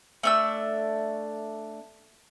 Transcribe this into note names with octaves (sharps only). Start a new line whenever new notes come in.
A3 D4 E6